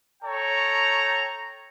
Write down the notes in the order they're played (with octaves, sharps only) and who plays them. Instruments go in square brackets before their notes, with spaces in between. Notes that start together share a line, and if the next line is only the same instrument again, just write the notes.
[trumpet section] A4 C#5 G5 A#5